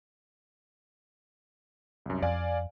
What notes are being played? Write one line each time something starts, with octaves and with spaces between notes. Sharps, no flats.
C2 F#2
F2 D5 F5 G#5